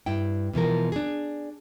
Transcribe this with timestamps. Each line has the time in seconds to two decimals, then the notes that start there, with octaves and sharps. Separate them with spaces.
0.06 G2 E4 G5
0.53 B2 E3 F3 A#4
0.92 D4 G#4